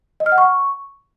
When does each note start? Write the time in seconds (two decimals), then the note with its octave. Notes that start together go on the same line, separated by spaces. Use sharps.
0.20 D#5
0.26 F6
0.32 F#5
0.38 C#6